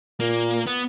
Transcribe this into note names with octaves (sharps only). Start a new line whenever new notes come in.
A#2 A#3
B3